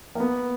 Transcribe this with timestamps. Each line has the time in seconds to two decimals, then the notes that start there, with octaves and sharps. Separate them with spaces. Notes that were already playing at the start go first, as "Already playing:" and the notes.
0.15 A#3
0.20 B3